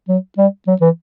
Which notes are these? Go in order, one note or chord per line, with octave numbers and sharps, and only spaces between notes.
F#3
G3
F#3
E3